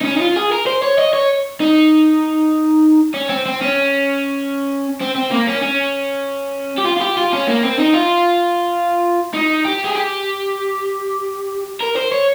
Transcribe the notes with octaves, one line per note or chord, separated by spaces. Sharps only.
D#4
C#4
D#4
F4
G#4
A#4
C5
C#5
D#5
C#5
D#4
C#4
C4
C4
C#4
C4
C4
A#3
C#4
C#4
G4
F4
F4
G4
F4
C#4
A#3
C4
D#4
F4
D#4
G4
G#4
G4
A#4
C5
C#5